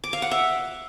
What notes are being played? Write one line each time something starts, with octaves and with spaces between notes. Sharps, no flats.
D6
F5
F#5
E5